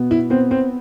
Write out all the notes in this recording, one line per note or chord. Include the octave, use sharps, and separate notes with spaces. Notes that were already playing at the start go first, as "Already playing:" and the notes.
Already playing: B2 B3
E4
B3 C4
C4